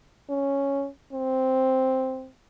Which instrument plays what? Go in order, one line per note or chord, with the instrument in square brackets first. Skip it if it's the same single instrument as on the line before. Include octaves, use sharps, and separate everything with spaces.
[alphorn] C#4
C4